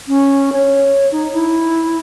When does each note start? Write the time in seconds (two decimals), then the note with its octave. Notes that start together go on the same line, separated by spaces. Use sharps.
0.08 C#4
0.53 C#5
1.12 D#4
1.33 E4